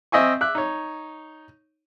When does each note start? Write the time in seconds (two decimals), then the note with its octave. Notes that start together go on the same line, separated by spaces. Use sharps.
0.12 C4 D#5 E5 G#5 C#6
0.41 E5 D6 F#6
0.55 D#4 C#5